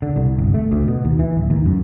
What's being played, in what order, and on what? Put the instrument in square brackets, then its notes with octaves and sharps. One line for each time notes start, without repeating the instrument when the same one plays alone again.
[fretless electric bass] D3
C2
G1
A3
D2
B2
D#2
E3
D1
D#2
F#2